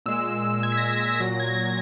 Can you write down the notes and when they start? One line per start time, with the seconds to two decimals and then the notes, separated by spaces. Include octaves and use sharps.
0.06 A#2 G#3 E6
0.63 G#6
0.72 B6
0.78 A#6
0.91 A#6
1.11 B6
1.20 A#2 F#3 A#6
1.40 G#6
1.48 A#6
1.63 G#6